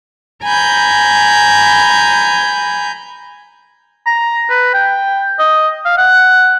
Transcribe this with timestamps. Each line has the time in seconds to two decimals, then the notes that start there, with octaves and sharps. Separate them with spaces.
0.44 G#5 A#5 B5 G6
4.06 A#5
4.50 B4
4.74 G5
5.39 D#5
5.85 F5
5.97 F#5